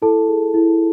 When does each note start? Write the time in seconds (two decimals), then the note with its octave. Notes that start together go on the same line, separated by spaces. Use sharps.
0.02 E4 A4 A5
0.28 G#4
0.54 E4